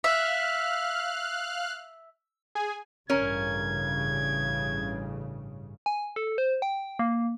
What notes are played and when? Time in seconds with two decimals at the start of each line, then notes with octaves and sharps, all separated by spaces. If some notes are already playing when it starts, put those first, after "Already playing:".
0.04 E5 F5 F6 F#6
2.55 G#4 G#5
3.10 A1 G2 C#3 C#4 A#4 G#6
5.86 G#5
6.16 A4
6.38 C5
6.62 G5
6.99 A#3